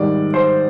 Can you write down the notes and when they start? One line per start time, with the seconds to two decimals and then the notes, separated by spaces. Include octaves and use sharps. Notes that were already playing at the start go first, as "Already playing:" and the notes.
Already playing: G#2 D#3 G3 D5
0.34 C5